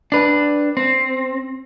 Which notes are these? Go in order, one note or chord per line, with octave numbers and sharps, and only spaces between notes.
D4 B4
C4